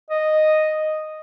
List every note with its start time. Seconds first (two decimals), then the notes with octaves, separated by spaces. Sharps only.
0.10 D#5